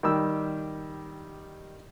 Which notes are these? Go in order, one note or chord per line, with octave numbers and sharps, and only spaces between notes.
D#3 G3 G4 E6